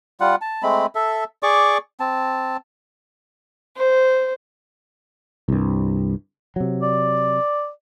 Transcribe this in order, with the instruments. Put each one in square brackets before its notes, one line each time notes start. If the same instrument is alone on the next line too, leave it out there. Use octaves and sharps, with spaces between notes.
[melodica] G3 F4 F#5
A5
G#3 A3 C4 B5
A4 E5
G#4 D5 C#6 D6
C4 A5
[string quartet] C5
[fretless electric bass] C2 G2
C3 F#3
[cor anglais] D5